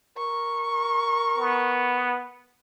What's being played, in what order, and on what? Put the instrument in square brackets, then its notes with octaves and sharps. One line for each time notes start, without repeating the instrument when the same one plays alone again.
[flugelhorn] A#4 [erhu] C#6
[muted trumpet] B3